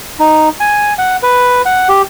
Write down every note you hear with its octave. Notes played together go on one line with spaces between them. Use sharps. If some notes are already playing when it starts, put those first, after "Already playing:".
D#4
G#5
F#5
B4
F#5
G4